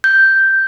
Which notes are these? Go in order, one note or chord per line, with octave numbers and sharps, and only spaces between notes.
G6